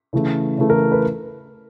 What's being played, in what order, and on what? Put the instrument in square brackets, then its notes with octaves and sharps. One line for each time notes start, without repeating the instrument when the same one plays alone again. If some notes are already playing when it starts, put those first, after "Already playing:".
[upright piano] C#3 E3 A3
C#3 E3 A3
A#4
B4